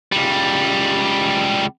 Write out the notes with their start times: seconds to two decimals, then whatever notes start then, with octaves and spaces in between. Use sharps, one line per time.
0.12 C#2 G3